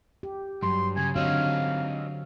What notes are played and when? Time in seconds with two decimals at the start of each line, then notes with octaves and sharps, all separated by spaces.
0.23 G4
0.63 G2 F#3 C6
0.96 C#3 G#5
1.16 D3 C4 D#4 F#4 C#5 F5